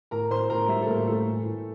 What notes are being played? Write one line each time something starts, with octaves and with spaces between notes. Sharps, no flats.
A2 A#4 A#5
A2 C5 C6
A2 A#4 A#5
G3 E4 E5
A4
A2 A#3 A#4
A2 A3 A4
E3
A2